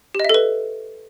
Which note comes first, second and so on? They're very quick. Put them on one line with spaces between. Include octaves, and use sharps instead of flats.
G4 D#5 E5 A4 B4